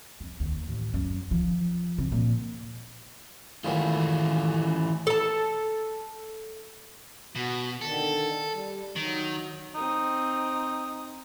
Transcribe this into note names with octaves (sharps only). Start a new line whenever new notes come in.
F2
D#2
A1
F#2
F3
C3
A#2
D#3 E3 F#3 G#3 A3 F4
A4 A5
B2 F#4
D3 D#3 A4
G3
D#3 F#3
C4 D#4 D#6